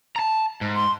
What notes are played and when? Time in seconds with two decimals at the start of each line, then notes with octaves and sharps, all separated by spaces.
0.16 A5 A#5
0.61 G#2
0.76 C6